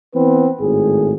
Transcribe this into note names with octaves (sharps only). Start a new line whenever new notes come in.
E3 B3 C4 B4
G#1 A2 G#4